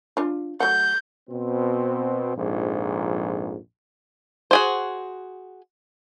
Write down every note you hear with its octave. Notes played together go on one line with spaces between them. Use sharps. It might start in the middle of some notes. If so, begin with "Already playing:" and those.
D4 F4
F#3 A3 F#5 G6
B2 C4
A#1 F2 G#2
F#4 G#4 C5